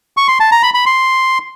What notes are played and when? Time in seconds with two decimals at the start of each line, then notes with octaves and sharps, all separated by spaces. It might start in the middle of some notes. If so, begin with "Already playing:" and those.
0.17 C#6
0.28 C6
0.40 A5
0.52 A#5
0.63 B5
0.74 B5
0.86 C6